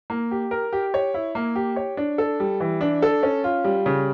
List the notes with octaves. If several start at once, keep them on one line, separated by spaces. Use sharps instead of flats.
A#3
G4
A#4
G4
C#5
E4
A#3
G4
C#5
D4
A4
G3
E3
D4
A4
C#4
F4
G3
C#3